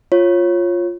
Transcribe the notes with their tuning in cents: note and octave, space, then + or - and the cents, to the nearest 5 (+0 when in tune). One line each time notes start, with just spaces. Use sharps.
F4 +0 C#5 -20